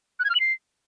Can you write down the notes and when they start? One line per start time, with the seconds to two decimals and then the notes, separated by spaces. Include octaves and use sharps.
0.19 F#6
0.25 G#6
0.30 F6
0.35 F#7
0.40 C7